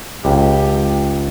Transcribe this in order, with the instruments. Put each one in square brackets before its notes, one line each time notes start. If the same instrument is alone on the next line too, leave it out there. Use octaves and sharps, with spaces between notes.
[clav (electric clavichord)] C#2 [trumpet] G4